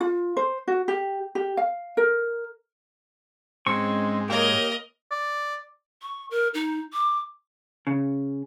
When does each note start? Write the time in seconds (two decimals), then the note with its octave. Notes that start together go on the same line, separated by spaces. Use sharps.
0.01 F4
0.37 C5
0.68 F#4
0.88 G4
1.35 G4
1.57 F5
1.97 A#4
3.67 G#2 G#3 C4 C#4 C#6
4.30 A#3 G4 A#4 C#5 D#5
5.11 D5
6.02 C#6
6.31 A#4
6.54 D#4
6.93 D6
7.87 C#3